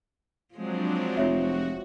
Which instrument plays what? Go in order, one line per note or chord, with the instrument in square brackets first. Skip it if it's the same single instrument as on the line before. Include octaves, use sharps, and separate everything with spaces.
[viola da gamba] F3 G#3 C4 [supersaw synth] F#3 D4
[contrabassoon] F1 [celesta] F4 C#5 E5 [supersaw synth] F#4